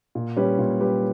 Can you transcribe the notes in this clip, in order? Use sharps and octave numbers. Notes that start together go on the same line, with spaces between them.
A#2
G3 C#4 G4 B4
A#2
G3 C#4 G4 B4